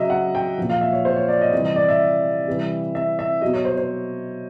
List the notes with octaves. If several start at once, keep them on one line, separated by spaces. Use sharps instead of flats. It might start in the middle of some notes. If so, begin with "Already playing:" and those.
Already playing: C#3 F#3 D#5 E5
F#5
G5
A#2 F3
F5
E5
C#5
C5
C#5
D5
D#5
C3 E3 G3 D#5
D#5
D5
E5
C3 E3 G3
E5
E5
B2 F#3 D#5
C#5
C5
C5